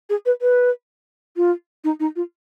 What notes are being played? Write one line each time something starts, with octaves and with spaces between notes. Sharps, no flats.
G#4
B4
B4
F4
D#4
D#4
F4